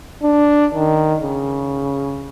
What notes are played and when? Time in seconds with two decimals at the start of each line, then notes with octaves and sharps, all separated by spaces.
0.22 D4
0.75 D#3
1.21 C#3